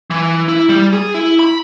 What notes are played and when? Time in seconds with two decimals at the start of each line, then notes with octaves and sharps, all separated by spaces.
0.10 E3
0.49 E4
0.69 G3
0.93 G#4
1.14 E4
1.39 B5